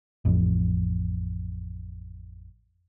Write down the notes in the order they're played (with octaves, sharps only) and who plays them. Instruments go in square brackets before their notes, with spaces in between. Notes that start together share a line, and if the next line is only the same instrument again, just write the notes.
[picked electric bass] A1 F2